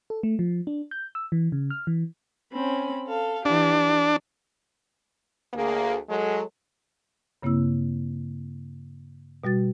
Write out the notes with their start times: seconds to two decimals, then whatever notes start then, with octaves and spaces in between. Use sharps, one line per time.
0.10 A4
0.23 A3
0.39 F3
0.67 D4
0.91 G6
1.15 E6
1.32 E3
1.52 C#3
1.70 F6
1.87 E3
2.53 C4 C#4 B5
3.07 A4 F5
3.45 E3 D4 G4
5.54 D2 A#3 G#4
6.09 F#3 G#3 A4
7.43 G2 C#3 A#3 C4 E4 E6
9.44 B2 G3 F#4 A6